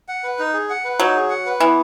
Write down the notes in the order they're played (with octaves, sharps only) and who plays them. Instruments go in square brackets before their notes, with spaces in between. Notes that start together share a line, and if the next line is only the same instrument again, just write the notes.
[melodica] F#5
B4
D#4
G#4
F#5
B4
[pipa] F#3 [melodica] D#4
[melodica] G#4
F#5
B4
[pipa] E3 [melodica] B3